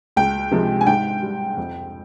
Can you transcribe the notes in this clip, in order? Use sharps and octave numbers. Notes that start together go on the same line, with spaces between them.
C#2 G5
C3 F3 G#3
G#5
G#2 G5
G3
F2